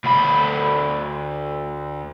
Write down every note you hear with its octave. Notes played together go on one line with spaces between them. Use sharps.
D2 B5